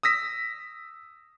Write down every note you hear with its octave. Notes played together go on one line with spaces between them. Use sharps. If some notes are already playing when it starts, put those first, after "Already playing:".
D#6 E6 A#6 B6